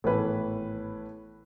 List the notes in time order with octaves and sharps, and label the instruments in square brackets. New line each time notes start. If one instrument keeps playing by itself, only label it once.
[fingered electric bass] G#1 B3 [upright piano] A2 E3 B4